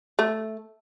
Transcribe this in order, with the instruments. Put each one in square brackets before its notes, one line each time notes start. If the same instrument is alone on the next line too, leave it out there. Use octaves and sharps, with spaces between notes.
[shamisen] A3